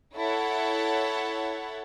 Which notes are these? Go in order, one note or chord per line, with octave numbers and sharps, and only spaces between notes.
E4 A4 C#5 F#5